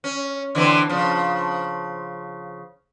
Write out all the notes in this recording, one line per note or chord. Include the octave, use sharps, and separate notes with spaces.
C#4
D3 E3 C4
C#3 F3